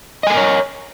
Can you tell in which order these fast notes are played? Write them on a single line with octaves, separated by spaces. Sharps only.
D#5 G#5 A4 A#4 C#5